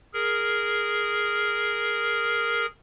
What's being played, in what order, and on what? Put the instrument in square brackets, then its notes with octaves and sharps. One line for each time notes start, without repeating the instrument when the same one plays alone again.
[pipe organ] G#4 A#4